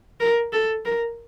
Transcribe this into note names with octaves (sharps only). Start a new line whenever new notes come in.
A#4
A4
A#4